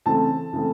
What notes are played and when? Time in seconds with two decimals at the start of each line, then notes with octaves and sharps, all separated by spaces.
0.06 C#3 E3 A3 C4 A5
0.53 C#3 E3 A3 C4